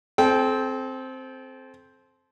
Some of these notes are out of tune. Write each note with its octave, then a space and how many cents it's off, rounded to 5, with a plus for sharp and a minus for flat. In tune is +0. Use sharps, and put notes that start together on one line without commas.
C4 +0 A4 -35 G5 +0